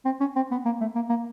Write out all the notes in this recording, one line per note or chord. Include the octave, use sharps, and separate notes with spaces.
C4
C#4
C4
B3
A#3
A3
A#3
A#3